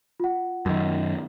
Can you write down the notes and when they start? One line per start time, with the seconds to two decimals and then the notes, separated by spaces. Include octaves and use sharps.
0.20 F4 F#5
0.66 F#2 D#3